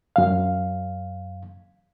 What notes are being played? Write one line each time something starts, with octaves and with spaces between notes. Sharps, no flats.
F#2 F5